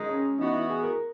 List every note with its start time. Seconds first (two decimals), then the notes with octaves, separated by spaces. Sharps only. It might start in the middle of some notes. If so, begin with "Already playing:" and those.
Already playing: F#2 D#3 G#3 D#4
0.09 C#4
0.38 E3 B3 D#4 F#4
0.53 E4
0.69 G#4
0.83 A#4